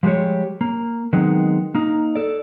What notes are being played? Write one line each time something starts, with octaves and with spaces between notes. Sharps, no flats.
F3 G3 G#3 G4 C#5
A#3
D#3 F#3 G#3 B3 C4 D#4
A#3 D#4
A4 D5